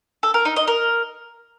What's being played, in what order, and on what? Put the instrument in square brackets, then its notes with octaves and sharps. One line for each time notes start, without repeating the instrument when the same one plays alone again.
[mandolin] A4
A#4
D#4
D#5
A#4